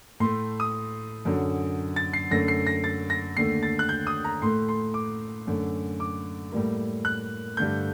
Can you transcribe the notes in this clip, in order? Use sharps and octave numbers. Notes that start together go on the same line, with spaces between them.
A2 A3 C6
D#6
F#2 D3 F#3
A6
C7
F#2 D3 A3 A#6
C7
A#6
A6
A#6
D#2 D3 A3 C7
A6
F#6
G6
D#6
A#5
A2 A3 C6
C6
D6
F#2 D3 A3
D6
A2 G3 A#3
F#6
G2 D3 A3 G6